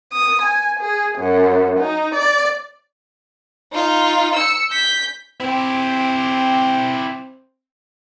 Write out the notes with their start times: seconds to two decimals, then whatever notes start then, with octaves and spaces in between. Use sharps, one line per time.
0.12 D#6
0.42 G#5
0.81 G#4
1.18 F#2
1.80 D#4
2.14 D5
3.73 D#4 F4
4.35 E6 C#7
4.71 G6 B6
5.40 C4 E4 G4